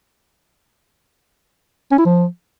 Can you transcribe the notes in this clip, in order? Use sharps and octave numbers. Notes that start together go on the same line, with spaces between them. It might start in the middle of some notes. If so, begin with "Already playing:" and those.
C#4
E4
F3